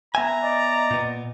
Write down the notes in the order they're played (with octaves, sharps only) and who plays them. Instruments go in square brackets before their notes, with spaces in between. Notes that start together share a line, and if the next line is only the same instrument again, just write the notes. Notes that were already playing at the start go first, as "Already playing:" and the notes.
[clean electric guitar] B3 E5 G#5 [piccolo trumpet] A#5
[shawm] D5 [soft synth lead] D#5
[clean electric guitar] A#2 B3